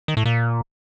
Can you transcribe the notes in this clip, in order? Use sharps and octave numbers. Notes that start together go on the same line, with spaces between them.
D#3
A2
A#2